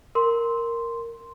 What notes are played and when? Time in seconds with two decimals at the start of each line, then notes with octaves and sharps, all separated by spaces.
0.15 A#4 C6